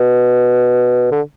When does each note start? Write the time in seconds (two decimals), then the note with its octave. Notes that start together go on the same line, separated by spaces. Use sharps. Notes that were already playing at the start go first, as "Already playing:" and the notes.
Already playing: B2
1.12 D3